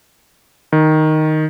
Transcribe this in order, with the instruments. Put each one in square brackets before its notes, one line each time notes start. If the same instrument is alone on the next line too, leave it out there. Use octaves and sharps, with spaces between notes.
[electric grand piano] D#3